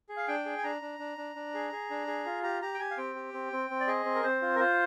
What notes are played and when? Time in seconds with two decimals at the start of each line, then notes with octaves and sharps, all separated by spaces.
0.09 G#4
0.17 F5
0.28 D4 G5
0.46 G#4
0.58 G#5
0.64 D4 A#5
0.82 D4
0.99 D4
1.18 D4
1.36 D4
1.54 G#4
1.72 G#4
1.90 D4
2.07 G#4
2.26 F4
2.43 G4 A#5
2.62 G4 A#5
2.74 G5
2.79 G4 G#5
2.91 F5
2.97 C4 G5
3.15 G4
3.33 C4
3.52 C4
3.70 C4
3.80 D5
3.88 G#4 D#5
4.05 C4
4.15 A#4
4.23 C4 C5
4.42 F4
4.56 A#4
4.59 F4 C5